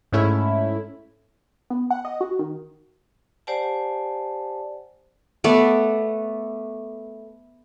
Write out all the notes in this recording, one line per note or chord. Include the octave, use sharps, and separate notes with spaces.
G#2 A3 C#4 E4
B3
F#5
D#5
F#4
D#3
G4 C5 D5 F#5 G#5 A5
A3 B3 D5